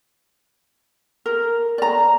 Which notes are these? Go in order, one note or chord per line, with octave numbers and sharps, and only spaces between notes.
A#4
D5 A#5